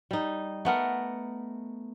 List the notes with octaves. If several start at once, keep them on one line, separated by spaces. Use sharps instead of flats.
G3 D#4
A3 B3 A#4